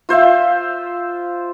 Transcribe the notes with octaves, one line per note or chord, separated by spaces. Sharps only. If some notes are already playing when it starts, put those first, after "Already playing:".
F4 C5 E5 F5